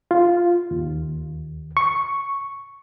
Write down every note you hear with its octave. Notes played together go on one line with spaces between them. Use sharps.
F4
D#2
C#6